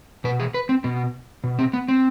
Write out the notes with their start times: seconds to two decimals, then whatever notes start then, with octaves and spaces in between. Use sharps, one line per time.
0.24 B2 B4
0.40 G#4
0.54 B4
0.69 C4
0.84 B2 B3
1.44 B2
1.59 C4
1.73 B3
1.88 C4